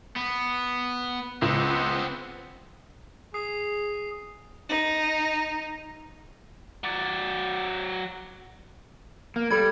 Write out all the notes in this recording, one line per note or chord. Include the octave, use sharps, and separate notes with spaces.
B3
C#2 B3 C4
G#4 D#6 C7
D#4
F#3 D5
A#3
G3 A4 B5 G#6